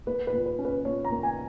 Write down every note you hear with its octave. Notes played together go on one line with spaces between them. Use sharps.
A#3 B4
B4
A#2
B4
C#4
B4
A#2 C#5
A#5
A#3
G#5